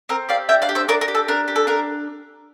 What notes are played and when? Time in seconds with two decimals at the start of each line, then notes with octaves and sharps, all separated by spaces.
0.09 C4 A#4
0.29 G4 D5 F5
0.49 D4 E5 G5
0.62 D5 F5
0.69 G4
0.75 C5 E5
0.88 D4 A#4 D5
1.01 A#4
1.08 G4
1.15 A4
1.28 D4 A#4
1.48 G4
1.56 A4
1.67 D4 A#4